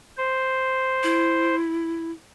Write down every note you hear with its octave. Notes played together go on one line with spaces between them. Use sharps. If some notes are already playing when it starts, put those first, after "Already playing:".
C5
E4